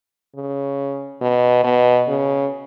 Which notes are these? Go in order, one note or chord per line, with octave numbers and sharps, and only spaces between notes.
C#3
B2
B2
C#3